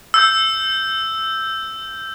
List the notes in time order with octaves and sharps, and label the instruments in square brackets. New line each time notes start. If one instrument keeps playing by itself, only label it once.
[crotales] E6 G6